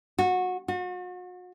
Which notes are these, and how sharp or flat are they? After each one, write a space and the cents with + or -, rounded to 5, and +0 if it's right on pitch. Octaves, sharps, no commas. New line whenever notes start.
F#4 -20
F#4 -40